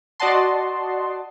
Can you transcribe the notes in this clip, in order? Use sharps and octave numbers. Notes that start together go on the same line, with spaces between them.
F#4 D5 D#5 F#5 A5 C6